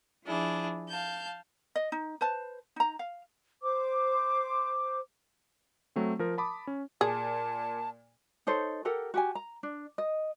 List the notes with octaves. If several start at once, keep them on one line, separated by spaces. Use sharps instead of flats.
F3 D4 E4 G#4
F5 A5 G6
D#5
D#4
B4 C5 A5
D#4 A#5
F5
C5 D6
F#3 A3 C4
F3 A#4
A5 B5 D6 D#6
C#4
A#2 G#4 A5
D#4 A4 C5 C#5
G4 A4 A#4 F#5
F#4 G4 G#5
A#5
D4
D#5